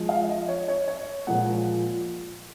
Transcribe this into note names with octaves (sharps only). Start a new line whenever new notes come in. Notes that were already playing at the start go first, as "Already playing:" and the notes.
Already playing: F3 G#3
F5
D#5
C#5
C#5
C#5
A#2 F3 G#3 F#5